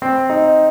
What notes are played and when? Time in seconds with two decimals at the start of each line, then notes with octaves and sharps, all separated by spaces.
0.02 C4
0.30 D#4